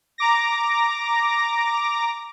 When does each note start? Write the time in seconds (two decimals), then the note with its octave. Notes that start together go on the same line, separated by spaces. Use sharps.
0.18 A#5 D6 A#6